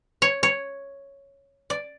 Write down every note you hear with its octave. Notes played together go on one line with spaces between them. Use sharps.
C#5
C#5
D5